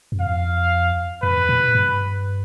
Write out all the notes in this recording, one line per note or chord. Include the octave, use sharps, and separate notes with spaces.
F#2
F2 F5
F2 B4
A#2
G2